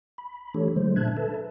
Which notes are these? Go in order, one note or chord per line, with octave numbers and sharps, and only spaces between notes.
B5
E3 A3 D4 G4 A4 C#5
D3 F3 F#3 G#3 A3 C5
A#2 D4 E5 A5 F#6 G#6
A4 B4 E5 A5